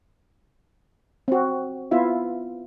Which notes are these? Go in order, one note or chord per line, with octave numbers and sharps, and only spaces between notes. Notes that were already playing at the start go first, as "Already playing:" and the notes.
C4 F#4
B3 E4 F4 E5